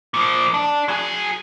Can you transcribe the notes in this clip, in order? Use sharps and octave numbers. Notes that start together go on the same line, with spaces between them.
A#2 F3
D4
F#3 G#4